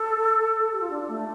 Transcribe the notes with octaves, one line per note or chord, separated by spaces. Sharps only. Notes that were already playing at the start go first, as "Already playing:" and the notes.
Already playing: A4
G4
F4
D4
A3